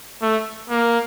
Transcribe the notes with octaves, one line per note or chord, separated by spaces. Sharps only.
A3
A#3